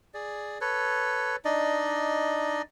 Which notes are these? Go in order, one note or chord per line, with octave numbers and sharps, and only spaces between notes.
G#4 D5
A4 B4 C#5
D4 D#4 D5 D#5